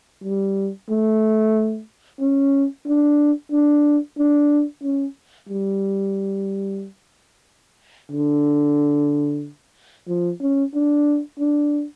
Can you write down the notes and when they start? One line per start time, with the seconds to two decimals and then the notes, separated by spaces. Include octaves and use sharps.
0.24 G3
0.89 A3
2.20 C#4
2.86 D4
3.52 D4
4.18 D4
4.83 C#4
5.49 G3
8.11 D3
10.08 F3
10.41 C#4
10.74 D4
11.39 D4